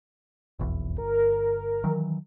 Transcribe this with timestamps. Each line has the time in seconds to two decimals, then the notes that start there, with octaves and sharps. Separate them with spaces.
0.59 F1 B1 E2
0.98 G1 A#4
1.84 D#3 E3 F#3